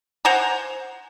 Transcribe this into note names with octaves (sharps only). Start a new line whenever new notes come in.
C5 F#5 G#5 A#5